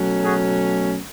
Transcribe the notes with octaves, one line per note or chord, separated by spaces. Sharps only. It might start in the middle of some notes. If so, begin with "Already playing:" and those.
Already playing: B2 F#3 A3 C#4
F#4 G#4